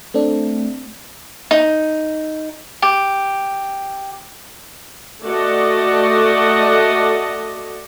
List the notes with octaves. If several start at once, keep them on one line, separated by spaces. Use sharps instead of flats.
A3 C4 D4
D#4
G4
A3 F#4 A4 D5 D#5 F#5